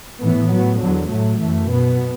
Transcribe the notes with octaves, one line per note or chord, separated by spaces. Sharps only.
A2 E3 B3
A2 F#3 B3
E2 D3 F#3
A2 F#3 A3
F#2 E3 A3
B2 B3